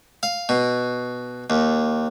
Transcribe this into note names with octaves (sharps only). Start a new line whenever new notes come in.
F5
B2
D#2